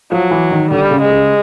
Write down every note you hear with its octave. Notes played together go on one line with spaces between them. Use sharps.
F3 F#3
E3
D#3
D3 G3
C#3
G#3
C#3